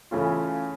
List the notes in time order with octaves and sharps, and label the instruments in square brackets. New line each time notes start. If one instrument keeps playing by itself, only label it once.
[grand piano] C#3 E3 A3 C#4 F4